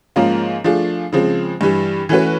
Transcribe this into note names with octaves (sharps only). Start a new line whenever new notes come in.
G#2 F3 A#3 C#4 F4
F3 A3 D4 F4 G#4
C#3 F3 G#3 C4
G2 E3 G3
E3 A3 C#4 F#4 B4